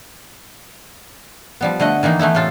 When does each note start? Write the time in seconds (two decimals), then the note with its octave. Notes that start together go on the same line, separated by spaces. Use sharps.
1.61 F3 G3 B3
1.80 D3 A3 D#5 F#5
2.03 D#3 E3 A#3 D#4
2.19 E3 A3 B3 E4
2.35 A2 C3 F4 A4